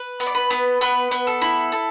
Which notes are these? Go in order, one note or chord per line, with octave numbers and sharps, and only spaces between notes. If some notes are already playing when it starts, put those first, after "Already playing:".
Already playing: B4
B3
D5
B4
B3
B3 B4
B3
A4
E4
A4